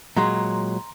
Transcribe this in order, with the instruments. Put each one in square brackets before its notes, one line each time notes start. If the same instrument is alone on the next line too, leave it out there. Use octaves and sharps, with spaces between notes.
[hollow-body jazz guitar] A#2 F#3 G#3 [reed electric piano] A#5 C6